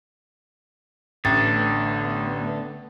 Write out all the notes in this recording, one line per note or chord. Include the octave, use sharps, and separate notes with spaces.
A1 D3 A3 B3 A6